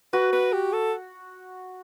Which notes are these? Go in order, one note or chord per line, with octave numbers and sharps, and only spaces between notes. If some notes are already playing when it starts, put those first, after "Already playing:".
F#4 B4
B4
G4
A4